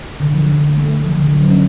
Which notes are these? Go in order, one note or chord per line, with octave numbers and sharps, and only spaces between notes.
D3
F3
D3
A3
A3
A3
F3
D3
F#3
C#4